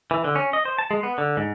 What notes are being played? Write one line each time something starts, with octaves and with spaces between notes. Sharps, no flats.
E3
D3
C#4
D#5
C5
A5
G#3
B3
D3
G#2